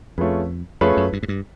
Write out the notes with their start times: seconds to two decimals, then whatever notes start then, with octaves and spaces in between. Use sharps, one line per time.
0.18 F2 A3 C#4 F4 G#4 B4
0.81 F2 A3 C#4 F4 G#4 B4
0.97 F#2
1.13 G2
1.23 G#2
1.28 G2